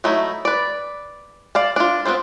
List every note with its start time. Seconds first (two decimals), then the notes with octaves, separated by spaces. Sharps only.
0.04 F#3 A3 D#4 E4
0.45 B4 D5
1.55 D5 F5 A5
1.76 D4 F4
2.05 B3 C4 D4 F4 C5